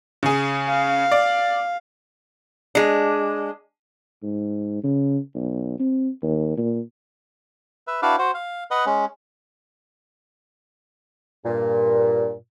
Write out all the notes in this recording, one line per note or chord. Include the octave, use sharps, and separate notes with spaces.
C#3 G#4
F5
D5
G#3 D4
G#2
C#3
B1
C4
D#2
A#2
B4 E5
D4 E4 F#4 B4 D5 F5
F#4 C5
F5
B4 D#5 F#5
G#3 C#4
G2 A#2